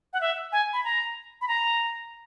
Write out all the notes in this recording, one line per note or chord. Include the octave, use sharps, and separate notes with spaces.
F#5
E5
G#5
B5
A#5
B5
A#5